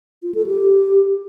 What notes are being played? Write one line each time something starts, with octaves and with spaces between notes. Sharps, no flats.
F4
A4
G4